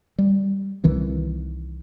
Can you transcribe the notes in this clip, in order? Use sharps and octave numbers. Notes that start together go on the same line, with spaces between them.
G3
C2 D#3 E3 C4